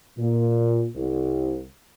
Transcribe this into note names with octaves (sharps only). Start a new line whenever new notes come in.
A#2
C2